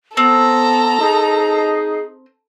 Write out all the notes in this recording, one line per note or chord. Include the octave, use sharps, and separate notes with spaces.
B3 C4 A4 A#5
D#4 G#4